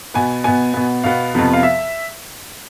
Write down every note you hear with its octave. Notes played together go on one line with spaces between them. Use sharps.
B2 B3 G#5
B2 B3 G#5
B2 B3
B2 B3 F5
F2 C3 F3 B3
F5
E5